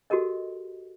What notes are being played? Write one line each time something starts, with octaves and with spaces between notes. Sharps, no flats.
F#4 G4 A4 A#4 D#5